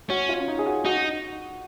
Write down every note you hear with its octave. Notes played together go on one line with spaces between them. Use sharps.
C#4 F#4
F4
C#4
D#4
G#4
F#4
D#4 F#4